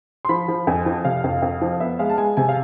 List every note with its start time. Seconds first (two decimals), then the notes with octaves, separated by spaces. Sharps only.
0.25 C6
0.29 F3 B5
0.48 F3
0.67 F2 G#5
0.86 F3
1.05 C3 F5
1.24 F2
1.42 F2
1.62 F3
1.80 B3 E5
1.99 G#3 F5
2.09 A5
2.18 G#3 G#5
2.37 C3 G#5
2.49 F5